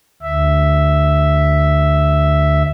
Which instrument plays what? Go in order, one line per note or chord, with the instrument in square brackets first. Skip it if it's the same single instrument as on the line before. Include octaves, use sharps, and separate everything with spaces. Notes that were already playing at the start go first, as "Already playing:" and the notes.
[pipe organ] D2 E5